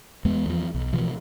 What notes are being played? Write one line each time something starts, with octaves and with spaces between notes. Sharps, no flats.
E2 G#3 B3
E2 F3
B1
B2 E3 F3